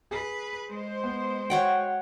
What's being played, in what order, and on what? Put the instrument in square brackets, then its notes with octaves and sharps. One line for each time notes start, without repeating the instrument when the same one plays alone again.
[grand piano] G#4 [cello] B4
[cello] G#3 [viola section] C5
[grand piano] B3
[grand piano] F#4 [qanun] C#5 F#5 G5